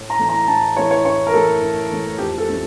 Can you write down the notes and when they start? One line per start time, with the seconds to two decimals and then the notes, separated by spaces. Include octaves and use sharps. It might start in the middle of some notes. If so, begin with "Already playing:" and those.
Already playing: A2
0.10 A#5
0.19 E3 A3 E4
0.29 A#5
0.48 A2 A5
0.76 E3 A3 E4 C#5
0.91 C#5
1.05 A2 C#5
1.27 A#4
1.33 E3 A3 E4 A4
1.62 A2
1.90 E3 A3 E4
2.18 F2 G4
2.38 A4
2.47 E3 A3 C#4 E4